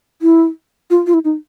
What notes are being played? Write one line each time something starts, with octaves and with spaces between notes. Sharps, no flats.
E4
F4
F4
E4
D#4